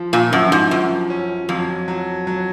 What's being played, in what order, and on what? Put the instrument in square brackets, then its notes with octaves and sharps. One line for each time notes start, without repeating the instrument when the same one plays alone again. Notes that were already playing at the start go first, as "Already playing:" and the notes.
Already playing: [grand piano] F3
[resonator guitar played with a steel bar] A#2
[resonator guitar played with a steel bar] F#2 [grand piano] F3
[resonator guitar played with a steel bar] G#2
[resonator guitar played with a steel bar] F#2 [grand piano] F3
[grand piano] C#4
[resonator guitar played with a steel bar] F2 [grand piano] F#3
[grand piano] F#3
F#3